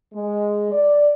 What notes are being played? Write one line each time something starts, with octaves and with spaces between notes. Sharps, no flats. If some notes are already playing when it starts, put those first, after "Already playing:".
G#3
D5